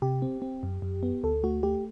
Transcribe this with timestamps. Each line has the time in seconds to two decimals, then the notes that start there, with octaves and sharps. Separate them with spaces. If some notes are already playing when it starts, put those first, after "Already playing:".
0.02 C3 G4
0.22 C4
0.42 C4
0.63 F#2
0.82 F#2
1.03 B3
1.24 D2 A4
1.43 A3 F#4
1.63 A3 G4